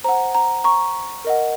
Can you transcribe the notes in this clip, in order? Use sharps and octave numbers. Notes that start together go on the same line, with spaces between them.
C5 F#5 A#5
A#5
A#5 C#6
A#4 D#5 F#5